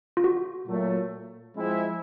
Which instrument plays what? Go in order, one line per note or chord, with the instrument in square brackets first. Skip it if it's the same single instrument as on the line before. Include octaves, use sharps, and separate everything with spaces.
[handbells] F4
F#4
[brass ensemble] A#2 F#3 A3
F3 G#3 C4 E4